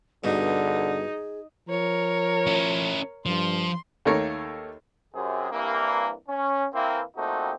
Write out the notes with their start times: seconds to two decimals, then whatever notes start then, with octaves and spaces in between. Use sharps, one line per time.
0.24 G2 B2 D3 D#4 G#4
1.68 F3 A#4 C#5
2.47 C#4 E4
3.26 G2 F3 C6
4.05 D#2 A3 A#3 A4 A#4 C#5
5.15 F#2 C3 G#4
5.51 C2 G2 E3 A#3
6.29 C#4
6.74 E3 A#3 C4
7.17 A#2 A3 C4 D#4 F#4 G4